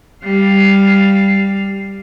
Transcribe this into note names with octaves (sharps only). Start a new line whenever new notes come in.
G3 F5